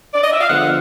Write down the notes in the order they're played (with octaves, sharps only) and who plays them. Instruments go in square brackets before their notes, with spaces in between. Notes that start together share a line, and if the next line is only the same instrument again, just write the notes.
[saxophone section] D5
D#5
E5
F5
D3 F3 G#3 B3 F#5